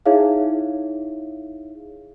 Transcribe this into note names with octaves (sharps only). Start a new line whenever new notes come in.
D#4 E4 G#4 C#5 E5 F5